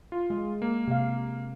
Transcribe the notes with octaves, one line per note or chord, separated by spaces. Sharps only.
F4
G#3
A#3
C3 F5